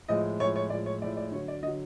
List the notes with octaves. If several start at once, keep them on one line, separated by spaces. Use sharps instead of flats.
A2 F3 G#3 D#5
A2 F3 G#3 C#5
C#5
A2 F3 G#3 D5
C#5
A2 F3 G#3 D5
D5
D3 F#3 C#5
D5
D3 F#3 D#5